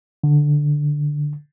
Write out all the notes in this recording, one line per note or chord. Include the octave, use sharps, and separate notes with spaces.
D3